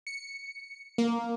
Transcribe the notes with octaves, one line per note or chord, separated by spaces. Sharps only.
C#7
A#3